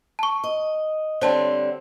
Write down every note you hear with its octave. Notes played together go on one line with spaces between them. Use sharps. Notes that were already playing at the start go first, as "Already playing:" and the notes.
A5 C#6
D#5
D3 G3 C4 C5 C#5 A5